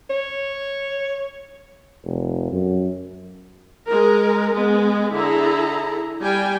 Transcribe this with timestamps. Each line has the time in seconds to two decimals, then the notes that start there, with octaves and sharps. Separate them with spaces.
0.10 C#5
2.04 F1
2.52 F#2
3.87 G#3 A#4
4.54 G#3 B3
5.13 D3 E4 G#4 A4 A#5
6.21 G3 G5 G#5